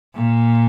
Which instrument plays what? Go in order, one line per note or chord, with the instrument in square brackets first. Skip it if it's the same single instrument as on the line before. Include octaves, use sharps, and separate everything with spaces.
[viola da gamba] A#2